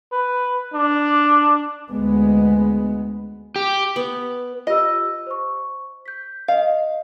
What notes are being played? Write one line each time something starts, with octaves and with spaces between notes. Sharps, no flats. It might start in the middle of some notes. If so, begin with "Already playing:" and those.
B4
D4
D2 G#3 B3
G4
B3
F4 G4 D#5 E6
C5 C#6
G6 B6
D#5 F5